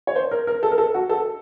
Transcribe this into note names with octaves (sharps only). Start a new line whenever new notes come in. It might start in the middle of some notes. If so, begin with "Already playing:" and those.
C#5
C5
A#4
A#4
A4
A#4
A4
F#4
A4